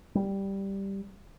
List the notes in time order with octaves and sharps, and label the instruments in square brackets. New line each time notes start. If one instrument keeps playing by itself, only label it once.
[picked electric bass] G3